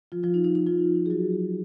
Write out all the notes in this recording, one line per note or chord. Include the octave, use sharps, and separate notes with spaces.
F3 F4
F3 F4
D#4
D#4
D#4
F3 F4
G#4
F#3 F#4